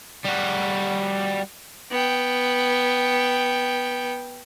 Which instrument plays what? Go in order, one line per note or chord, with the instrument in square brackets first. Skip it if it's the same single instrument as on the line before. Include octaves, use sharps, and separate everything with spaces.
[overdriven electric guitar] G3 F#4
[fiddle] B3 G5